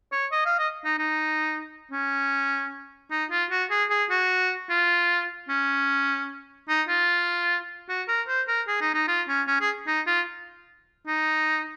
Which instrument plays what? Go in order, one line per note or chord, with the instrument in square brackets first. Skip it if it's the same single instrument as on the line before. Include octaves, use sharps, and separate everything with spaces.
[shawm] C#5
D#5
F5
D#5
D#4
D#4
C#4
D#4
F4
F#4
G#4
G#4
F#4
F4
C#4
D#4
F4
F#4
A#4
C5
A#4
G#4
D#4
D#4
F4
C#4
C#4
G#4
D#4
F4
D#4